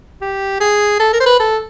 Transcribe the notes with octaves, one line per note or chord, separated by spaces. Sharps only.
G4
G#4
A4
A#4
C5
B4
A4